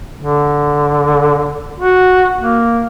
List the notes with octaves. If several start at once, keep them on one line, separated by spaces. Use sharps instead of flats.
D3
F#4
A#3